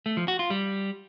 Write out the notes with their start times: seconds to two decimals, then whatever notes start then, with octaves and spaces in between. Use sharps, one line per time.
0.06 A3
0.17 F3
0.28 F#4
0.39 F4
0.50 G3